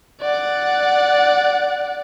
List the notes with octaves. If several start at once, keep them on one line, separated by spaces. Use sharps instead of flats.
D5 F#5